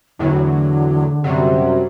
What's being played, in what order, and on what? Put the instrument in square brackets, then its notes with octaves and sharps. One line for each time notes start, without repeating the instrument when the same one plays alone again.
[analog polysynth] E2 A2 F#3 [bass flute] D3
[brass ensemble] F#2 C3 [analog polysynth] F#3 G3